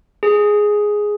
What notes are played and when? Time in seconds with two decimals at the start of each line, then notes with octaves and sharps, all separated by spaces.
0.23 G#4